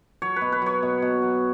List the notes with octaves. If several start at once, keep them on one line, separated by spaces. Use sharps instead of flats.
F#3 C#5
B4
B2
B4
F#3 C#5
B2
B2
F#3